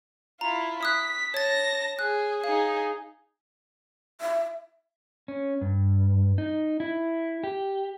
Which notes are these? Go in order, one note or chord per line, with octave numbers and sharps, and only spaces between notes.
E4 F4 A#5
D#6 F#6 B6
C#5 A5 A6 A#6
G#4 F#6
D#4 G#4 F5
E5
C#4
G2
D#4
E4
G4